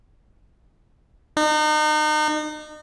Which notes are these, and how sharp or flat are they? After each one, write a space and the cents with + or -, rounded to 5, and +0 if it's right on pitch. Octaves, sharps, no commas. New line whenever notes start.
D#4 -35